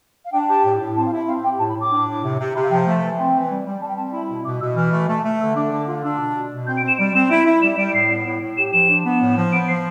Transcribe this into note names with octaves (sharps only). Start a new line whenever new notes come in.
F5
D4 G5
G4 A5
A2
A2
C4 A5
F5
E4
E5
C4 F5
G4 G5
A2 A5
B5
A2
D6
D4
A2
C3
C3
C3 B5
F5
F3 G5
A3 F5
E3
C4 G5
E3
G3
G3
G3 A5
G5
C4 A5
E4 B5
B2
B2 D6
B2 E6
E3 F6
A3
A3
A3
D3 E6
D4 D6
D3 D6
F4
D4 E6
B2
B2
B2
C4 G6
D7
C4 E7
G3 D7
C4 E7
E4 D7
E4
G3 E7
G3 D7
D7
A2 C7
B3
A2
A2
G4 E7
F3 E7
D4
B3
A2
F3
B3 D7
F3 C7